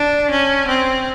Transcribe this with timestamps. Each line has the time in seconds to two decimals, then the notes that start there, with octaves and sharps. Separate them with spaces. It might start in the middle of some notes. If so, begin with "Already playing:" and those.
Already playing: D4
0.31 C#4
0.68 C4